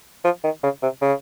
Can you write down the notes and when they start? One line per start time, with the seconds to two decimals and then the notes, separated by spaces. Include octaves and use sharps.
0.24 F3
0.44 D#3
0.63 C#3
0.82 C3
1.01 C#3